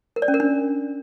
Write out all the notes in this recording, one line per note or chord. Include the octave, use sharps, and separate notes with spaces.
A#4
D5
C#4
A#4
D4